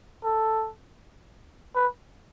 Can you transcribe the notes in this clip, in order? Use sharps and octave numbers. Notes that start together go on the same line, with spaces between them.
A4
B4